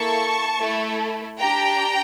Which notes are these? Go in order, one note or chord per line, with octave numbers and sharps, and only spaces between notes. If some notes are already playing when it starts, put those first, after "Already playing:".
Already playing: A#3 E4 A4 A5 C#6
A3 E4 A4
D4 G4 G5 A#5